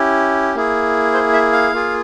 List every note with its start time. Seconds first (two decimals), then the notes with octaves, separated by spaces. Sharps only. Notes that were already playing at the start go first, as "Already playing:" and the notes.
Already playing: C#4 E4 G4
0.55 A#3 E4 G#4
1.14 C5
1.33 E5
1.53 F5
1.72 A#3 F4 G#4